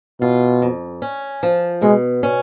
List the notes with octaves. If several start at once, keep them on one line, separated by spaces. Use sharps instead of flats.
B2 F4
F2
C#4
F3
B2 G#3
C#4